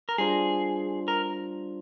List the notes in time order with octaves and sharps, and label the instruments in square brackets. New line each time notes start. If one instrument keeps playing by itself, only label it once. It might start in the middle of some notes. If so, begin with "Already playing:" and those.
[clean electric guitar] A#4
[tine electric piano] G3 D4 F4 C5 [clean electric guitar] G#4
[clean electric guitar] A#4